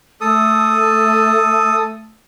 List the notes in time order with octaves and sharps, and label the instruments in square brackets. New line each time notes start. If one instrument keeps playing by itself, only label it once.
[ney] A3 [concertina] A4 D#6